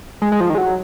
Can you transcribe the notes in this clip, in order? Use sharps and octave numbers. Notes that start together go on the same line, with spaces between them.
G#3
G#3
F3
D#3
G#3
F#3